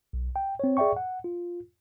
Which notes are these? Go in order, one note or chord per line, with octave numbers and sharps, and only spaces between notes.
B1
G5
C4 C#5
G#4 D5 E5 G5 C#6
F#5
F4